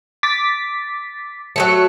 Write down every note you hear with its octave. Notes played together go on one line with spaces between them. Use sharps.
D6 A6 B6
F#3 G#3 A3 C#7